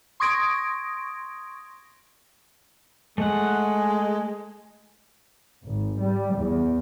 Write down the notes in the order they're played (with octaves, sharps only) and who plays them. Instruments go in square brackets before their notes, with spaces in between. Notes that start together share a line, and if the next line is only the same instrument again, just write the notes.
[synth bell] C6 C#6 D#6 G#6 A#6 D7
[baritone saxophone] G#3 [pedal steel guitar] A3 F#5
[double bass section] G#1
G3
E2